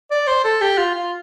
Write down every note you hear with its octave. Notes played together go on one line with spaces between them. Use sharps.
D5
C5
A4
G4
F4
F4